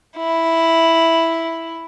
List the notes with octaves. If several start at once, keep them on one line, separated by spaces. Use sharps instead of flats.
E4